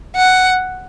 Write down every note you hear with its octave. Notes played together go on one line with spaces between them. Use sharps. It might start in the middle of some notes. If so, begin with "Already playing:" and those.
F#5